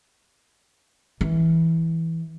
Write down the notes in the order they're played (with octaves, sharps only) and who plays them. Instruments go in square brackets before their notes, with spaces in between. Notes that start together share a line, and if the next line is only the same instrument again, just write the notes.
[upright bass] E3